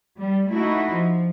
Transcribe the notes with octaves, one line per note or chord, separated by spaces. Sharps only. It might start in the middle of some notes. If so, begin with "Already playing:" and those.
G3
A3 D#4 E4 F#4
F3